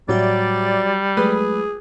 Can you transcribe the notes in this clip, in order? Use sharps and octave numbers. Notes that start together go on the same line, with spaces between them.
A2 F#3 G3 G4 D5 E5
F#3 G#3 A3 G#4 B4